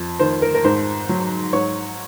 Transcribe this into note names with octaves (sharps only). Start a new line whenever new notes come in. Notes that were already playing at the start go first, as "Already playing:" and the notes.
Already playing: F2
D#3 C5
A#4
A#4
G#2 C5
F#3
G#2 C#5